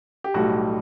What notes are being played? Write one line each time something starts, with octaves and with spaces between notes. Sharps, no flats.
G4
B1 A2 G3 F#4